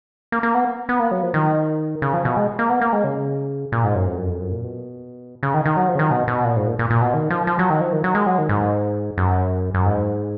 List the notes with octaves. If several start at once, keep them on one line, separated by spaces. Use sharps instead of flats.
A#3
A#3
B3
B3
A#3
F#3
F3
D#3
C#3
F3
B2
G#3
A#3
B3
A#3
G#3
C#3
A#2
G#2
F#2
F2
F#2
F2
F#2
A#2
B2
C#3
D#3
D#3
F#3
F3
C#3
D#3
B2
B2
A#2
G#2
A#2
A#2
A#2
B2
D#3
F3
F3
F#3
D#3
F3
D#3
F#3
G#3
F#3
D#3
G#2
F#2
F#2
G#2